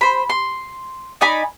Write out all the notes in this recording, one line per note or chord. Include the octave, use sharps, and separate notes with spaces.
C5 B5
C6
D#4 D5 G#5 B5